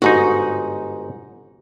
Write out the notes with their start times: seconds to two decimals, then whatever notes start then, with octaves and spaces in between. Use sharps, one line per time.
0.02 G1 G#2 D#4 F#4